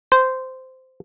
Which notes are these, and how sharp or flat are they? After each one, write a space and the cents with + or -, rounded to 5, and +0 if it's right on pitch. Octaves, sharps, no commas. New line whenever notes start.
C5 -15